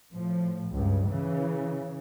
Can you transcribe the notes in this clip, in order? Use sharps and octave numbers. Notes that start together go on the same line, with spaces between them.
A2 F3
C#2 G2
C#3 E3